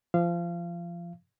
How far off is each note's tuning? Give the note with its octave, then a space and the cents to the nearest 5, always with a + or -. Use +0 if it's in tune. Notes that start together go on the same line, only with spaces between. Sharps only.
F3 -25 F5 -25